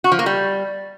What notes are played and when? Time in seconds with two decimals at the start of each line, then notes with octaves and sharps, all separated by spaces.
0.04 F#4
0.12 F3
0.19 A#3
0.26 G3